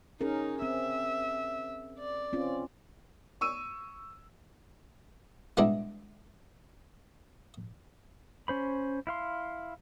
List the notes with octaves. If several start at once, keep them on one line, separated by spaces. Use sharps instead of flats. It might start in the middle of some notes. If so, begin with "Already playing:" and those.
C#4 D#4 G#4 A#4
C4 E5
D5
C4 C#4 F4
C#6 E6 D#7
G3 G#3 B3 D4 E4
C#4 C5 B5
E4 F5 C6